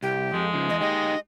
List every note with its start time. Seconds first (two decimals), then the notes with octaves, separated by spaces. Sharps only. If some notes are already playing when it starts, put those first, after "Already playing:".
0.03 C2 G4
0.34 F2 G#3
0.54 C#3 F3
0.69 E2 D#5
0.81 D#4 G4 D#5